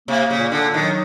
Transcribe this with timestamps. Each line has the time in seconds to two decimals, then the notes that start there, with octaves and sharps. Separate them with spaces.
0.08 C3 A#3
0.30 A#2 C#3
0.52 D3 D4
0.74 D#3 F#3